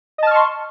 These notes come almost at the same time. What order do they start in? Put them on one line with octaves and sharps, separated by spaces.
D#5 A5 F6 C#6 C6